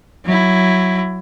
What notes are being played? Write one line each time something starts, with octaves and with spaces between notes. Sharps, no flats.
F#3 E4